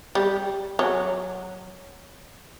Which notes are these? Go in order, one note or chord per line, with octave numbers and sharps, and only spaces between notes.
G3
F#3